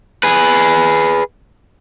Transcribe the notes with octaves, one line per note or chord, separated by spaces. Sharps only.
G#4 B4